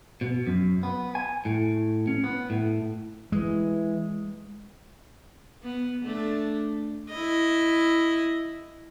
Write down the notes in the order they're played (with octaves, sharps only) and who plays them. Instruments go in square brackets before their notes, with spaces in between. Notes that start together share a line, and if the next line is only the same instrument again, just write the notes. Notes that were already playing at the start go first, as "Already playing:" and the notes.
[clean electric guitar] B2
F#2
B3
G#5
A2
C#4
B3
A2
[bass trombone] E3 [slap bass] G#3
[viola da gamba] B3
A3 D4
[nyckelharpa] E4 D#5